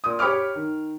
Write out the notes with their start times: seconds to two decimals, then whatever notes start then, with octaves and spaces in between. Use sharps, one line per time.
0.04 A#2 D#6
0.19 G4 C#5 B5 D6 F6
0.55 D#3